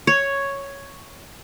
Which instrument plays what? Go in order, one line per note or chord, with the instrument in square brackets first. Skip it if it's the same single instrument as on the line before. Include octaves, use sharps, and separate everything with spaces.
[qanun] C#5